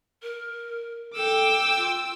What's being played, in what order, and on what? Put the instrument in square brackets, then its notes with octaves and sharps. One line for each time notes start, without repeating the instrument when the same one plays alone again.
[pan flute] A#4
[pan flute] A4 [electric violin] G5 D6 [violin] E6
[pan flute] F4